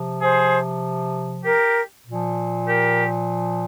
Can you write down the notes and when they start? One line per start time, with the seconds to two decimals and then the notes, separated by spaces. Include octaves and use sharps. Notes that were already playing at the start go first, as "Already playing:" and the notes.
Already playing: C3 F3
0.22 G#4 C5
1.44 G4 A#4
2.05 A#2 F3
2.66 G4 A#4